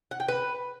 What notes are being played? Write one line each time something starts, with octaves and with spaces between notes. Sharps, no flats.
F#5
G5
B4